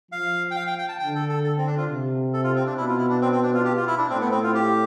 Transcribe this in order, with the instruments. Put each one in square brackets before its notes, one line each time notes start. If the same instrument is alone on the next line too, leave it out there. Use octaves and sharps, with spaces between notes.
[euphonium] F3 [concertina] F5
[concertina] G5
F5
G5
G5
A5
[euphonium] D3 [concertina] G5
[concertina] A4
A4
A4
C4
D4
F4
[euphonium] C3
[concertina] A4
F4
C4
D4
[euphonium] B2 [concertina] E4
[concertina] F4
E4
D4
C4
C4
D4
F4
G4
F4
E4
D4
[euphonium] A2 [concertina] C4
[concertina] B3
C4
F4
G4